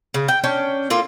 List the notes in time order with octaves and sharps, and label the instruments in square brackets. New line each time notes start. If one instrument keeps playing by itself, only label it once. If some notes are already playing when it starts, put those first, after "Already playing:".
[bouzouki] C#3
G5
C#4 D4 G5
A#3 F4 A4